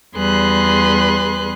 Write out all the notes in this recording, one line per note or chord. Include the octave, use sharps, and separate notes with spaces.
E2 G3 G#4 B4 C6 F#6